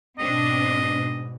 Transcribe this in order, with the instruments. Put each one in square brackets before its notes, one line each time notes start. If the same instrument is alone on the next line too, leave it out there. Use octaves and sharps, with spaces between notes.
[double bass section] G#2 B2 [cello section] C4 D4 [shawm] D#5